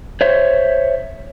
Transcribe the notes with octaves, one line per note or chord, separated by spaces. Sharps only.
C5 C#5 E5